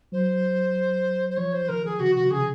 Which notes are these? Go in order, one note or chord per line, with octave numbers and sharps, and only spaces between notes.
F#3 C5
C5
F3 C#5
C5
D#3 A#4
G#4
C#3 F#4
C3 F#4
C#3 G#4